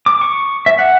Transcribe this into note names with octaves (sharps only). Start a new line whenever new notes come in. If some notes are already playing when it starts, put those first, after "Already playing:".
D6
C#6
E5
F#5